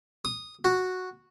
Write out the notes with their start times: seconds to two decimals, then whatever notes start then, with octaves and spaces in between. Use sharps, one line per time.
0.25 D#6
0.65 F#4